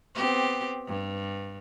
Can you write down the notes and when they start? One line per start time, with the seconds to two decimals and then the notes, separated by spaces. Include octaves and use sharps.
0.15 B3 C4 G4
0.87 G2